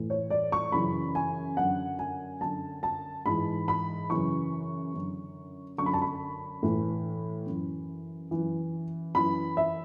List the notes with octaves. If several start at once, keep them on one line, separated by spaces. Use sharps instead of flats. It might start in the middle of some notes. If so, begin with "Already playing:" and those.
Already playing: A2 E3
C#5
D5
C#6
F#2 C#3 E3 B5
G#5
F#2 D3 F#5
G#5
F#2 D3 A5
A5
G#2 E3 B5
B5
F#2 C#3 E3 C#6
F#2 D3
F#2 D3 C#6
B5
A5
B5
A2 E3
F#2 E3
F#2 E3
F#2 E3 B5
E5